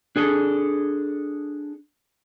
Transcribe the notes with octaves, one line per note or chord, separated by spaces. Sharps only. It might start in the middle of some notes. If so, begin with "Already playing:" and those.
D4 G#4 A4